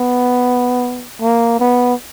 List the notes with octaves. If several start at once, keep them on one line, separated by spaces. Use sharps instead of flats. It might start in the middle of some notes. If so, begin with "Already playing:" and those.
Already playing: B3
A#3
B3